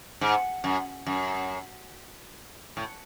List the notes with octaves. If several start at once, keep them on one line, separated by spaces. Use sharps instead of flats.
G#2
F#2
F#2
A2